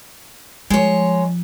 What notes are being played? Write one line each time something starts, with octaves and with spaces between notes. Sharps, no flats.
F3 G#3 C#5